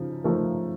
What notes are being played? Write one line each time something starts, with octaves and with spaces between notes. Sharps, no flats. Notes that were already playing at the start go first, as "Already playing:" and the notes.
Already playing: C#3 F3 D#4
F3 A3 D#4 A#4